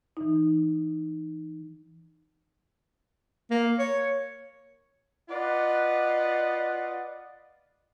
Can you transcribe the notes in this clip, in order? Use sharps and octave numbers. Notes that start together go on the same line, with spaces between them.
E3 D#4
A#3
C#5
F4 B4 D5 D#5 F#5